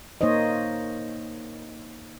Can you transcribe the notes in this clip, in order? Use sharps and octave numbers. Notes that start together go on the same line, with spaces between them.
A#3 D#4 C5 C#5 D#5